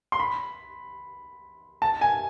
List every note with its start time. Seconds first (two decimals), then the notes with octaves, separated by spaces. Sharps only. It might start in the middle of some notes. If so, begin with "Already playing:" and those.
0.12 C6
0.20 B5
1.82 A5
2.01 G#5